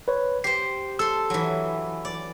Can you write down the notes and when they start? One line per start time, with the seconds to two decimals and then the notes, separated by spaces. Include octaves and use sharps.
0.08 B4 C#5
0.44 G4 C5 C7
0.99 A4 C6 E6
1.30 E3 F#3
2.05 D5